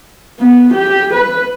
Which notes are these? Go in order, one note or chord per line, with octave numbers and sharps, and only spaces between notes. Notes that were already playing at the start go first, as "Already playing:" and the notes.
B3
G4
B4